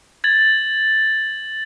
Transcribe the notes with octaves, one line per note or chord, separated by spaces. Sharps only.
G#6 A6 F#7